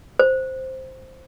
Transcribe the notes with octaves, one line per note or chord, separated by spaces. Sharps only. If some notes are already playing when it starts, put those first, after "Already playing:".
C5